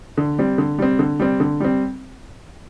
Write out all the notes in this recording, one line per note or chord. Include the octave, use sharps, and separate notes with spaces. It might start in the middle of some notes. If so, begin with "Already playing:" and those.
D3
G3 C4
D3
G3 C4
D3
G3 C4
D3
G3 C4